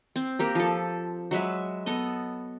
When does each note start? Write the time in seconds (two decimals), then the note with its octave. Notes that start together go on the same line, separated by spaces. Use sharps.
0.16 C4
0.39 A#3 G4 A#4
0.55 F3 A4
1.31 F#3 G#3 B4 E5
1.86 B3 A4 D#5